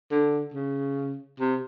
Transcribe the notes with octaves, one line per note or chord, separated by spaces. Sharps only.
D3
C#3
C3